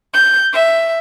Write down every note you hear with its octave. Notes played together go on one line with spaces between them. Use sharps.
G6
E5